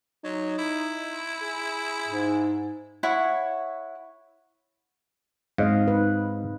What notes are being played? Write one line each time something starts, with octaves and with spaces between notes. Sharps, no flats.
F#3 D#4
E4
G#4
G#2
E4 C#5 F#5 C#6
G#2 C4 D#5 F5
D#4 B4